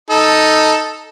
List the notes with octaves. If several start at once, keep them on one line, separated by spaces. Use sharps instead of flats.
D#4 A4